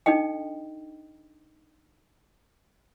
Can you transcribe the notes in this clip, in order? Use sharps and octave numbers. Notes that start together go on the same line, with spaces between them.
D4 D#4 A4 D#5 G5